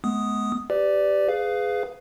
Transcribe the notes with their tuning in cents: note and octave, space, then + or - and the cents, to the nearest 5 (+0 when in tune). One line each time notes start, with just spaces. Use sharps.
G#3 +45 B3 +0 D#6 +0
G4 +0 B4 +35 D5 +0
G#4 +0 B4 +25 F5 +0